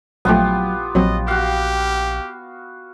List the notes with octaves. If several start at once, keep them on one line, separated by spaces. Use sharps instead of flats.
A#1 F3 F#3 A3 B3 F4 G4
A#1 F#3 C4 D#5
F#4 G4 F5